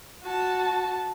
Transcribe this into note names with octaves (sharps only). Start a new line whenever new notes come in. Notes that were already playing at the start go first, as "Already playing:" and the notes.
F#4 A5